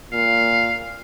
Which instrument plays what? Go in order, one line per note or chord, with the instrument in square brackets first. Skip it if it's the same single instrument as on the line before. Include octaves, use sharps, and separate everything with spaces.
[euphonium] A#2 [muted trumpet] F5